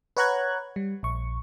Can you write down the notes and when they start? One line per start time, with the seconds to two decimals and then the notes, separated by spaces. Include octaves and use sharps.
0.17 B4 C#5 F#5 A#5 F#6 G#6
0.76 G3
1.03 A#1 C#6